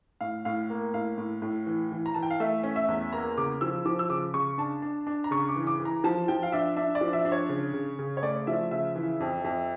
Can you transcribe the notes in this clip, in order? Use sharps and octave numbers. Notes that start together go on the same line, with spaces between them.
A2 F5
A2 F5
A#3
A2 F5
A2
A2
E3
E3
A#5
E3 A5
G5
F5
A3 E5
C#4
E5
E2
A#3 A#5
C#3 D6
F3 E6
F3 D6
E6
C#3 D6
C#3 C#6
D4 A5
D4
D4
A#5
C#3 C#6
D6
E3
D6
E3
A#5
F3 A5
F3 G5
F5
D4 E5
D4 E5
D5
F3
E5
D4
C#5
C#3
C#3
C#3
C#5
A3 D5
F3 E5
C#3 E5
E3
F2
F2